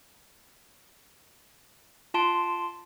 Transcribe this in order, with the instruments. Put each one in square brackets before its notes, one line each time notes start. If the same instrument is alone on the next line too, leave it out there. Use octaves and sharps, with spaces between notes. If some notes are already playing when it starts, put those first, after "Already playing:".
[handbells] F4 A5 C6 D7